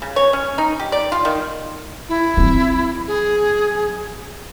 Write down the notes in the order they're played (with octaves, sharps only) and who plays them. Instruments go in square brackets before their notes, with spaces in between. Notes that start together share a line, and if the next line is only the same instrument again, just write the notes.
[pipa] C#3
C#5
C#4
D#4
G4
D5
F4
D#3
[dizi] E4
[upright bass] F#3 C4
[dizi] G#4